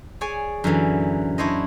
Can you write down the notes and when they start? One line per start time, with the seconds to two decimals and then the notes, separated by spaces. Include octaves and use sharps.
0.21 G#4 C#5 D5 G#5
0.64 F#2 D3 E3 F#3
1.38 D4 E4 C5 C#5 D#5